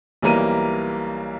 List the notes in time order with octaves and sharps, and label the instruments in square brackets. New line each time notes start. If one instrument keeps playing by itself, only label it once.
[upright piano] B1 E3 G3 A#3 A#5 D#7